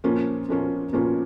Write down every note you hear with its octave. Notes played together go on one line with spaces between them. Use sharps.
A#2 F3 A#3 C#4 F4
A#2 F3 A#3 C#4 F4
A#2 F3 A#3 C#4 F4